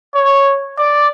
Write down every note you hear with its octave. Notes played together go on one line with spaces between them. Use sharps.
C#5
D5